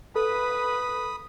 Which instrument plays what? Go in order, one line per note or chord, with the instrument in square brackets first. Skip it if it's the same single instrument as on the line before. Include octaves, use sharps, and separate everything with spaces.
[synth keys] A4 [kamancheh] B4 [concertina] B5 D#6